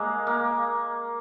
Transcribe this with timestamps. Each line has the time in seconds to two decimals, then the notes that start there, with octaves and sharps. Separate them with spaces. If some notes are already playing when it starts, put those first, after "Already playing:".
Already playing: G#3 A#3
0.27 A#3